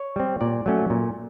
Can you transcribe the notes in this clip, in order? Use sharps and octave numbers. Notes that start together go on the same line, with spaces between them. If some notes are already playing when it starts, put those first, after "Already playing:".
Already playing: C#5
G3 C4
A#2 D5
F#3 A3 C#4
A#2